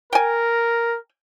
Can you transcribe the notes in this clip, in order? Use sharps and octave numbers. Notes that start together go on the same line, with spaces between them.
A#4 G5 G#5